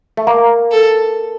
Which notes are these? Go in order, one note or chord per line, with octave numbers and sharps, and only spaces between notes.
A3
A#3
A4